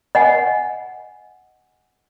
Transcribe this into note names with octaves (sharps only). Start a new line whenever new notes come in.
D#5 F#5 G#5